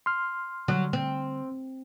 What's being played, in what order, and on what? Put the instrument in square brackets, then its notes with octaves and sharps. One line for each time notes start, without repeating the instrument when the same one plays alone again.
[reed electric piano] C6 F6
[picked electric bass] D3 G3 [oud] F#3
[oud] C4